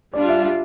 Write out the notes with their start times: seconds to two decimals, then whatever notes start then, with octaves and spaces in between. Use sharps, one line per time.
0.14 G3 D4 F4 D5
0.29 E5
0.43 E5